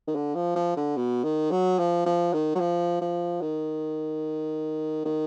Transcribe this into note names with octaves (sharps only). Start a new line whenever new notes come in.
D#3
D3
F3
F3
D3
B2
D#3
F#3
F3
F3
D#3
F#3
F3
F3
D#3
D#3